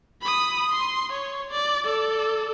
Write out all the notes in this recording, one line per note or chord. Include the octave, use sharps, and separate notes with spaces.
B5 D#6
C6
C#5
D5
A4 D5